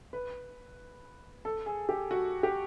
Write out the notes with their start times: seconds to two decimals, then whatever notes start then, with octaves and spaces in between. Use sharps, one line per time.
0.13 B4
1.45 A4
1.66 G#4
1.89 G4
2.11 F#4
2.43 G4